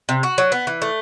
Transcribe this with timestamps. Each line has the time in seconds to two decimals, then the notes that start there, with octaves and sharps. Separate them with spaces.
0.09 C3
0.23 F#4
0.38 F#3
0.52 B3
0.67 E3
0.82 A3